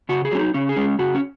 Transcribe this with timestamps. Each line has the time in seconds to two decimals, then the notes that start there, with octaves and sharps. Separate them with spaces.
0.09 C#3 F#4
0.25 G#4
0.31 F#3 C#4
0.39 D#4
0.54 C#3 C#4
0.69 G#4
0.76 G#3 C#4
0.99 C#3 F#4
1.15 C#4